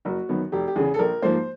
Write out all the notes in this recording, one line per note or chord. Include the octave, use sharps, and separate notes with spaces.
F#1 F#4
F#2 D#3 F#3 B3
F1 G4
G4
E2 C#3 G#4
A4
A#1 A#4
G#2 F3 A#3 C5